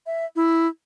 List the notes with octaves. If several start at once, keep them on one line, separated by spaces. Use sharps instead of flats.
E5
E4